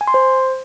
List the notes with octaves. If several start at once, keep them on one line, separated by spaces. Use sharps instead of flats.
G#5
C6
C5